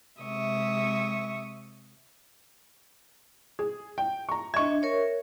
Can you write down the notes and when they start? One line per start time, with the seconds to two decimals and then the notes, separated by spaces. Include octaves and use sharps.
0.21 C3 G#3 E5 C#6 D#6
3.59 G#4
3.98 G5
4.29 A#5 C#6
4.54 D4 D#5 E5 C#6 G#6
4.82 A#4 C#5 E5